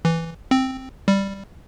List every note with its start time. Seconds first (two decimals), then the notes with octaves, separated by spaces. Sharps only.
0.05 E3
0.51 C4
1.08 G3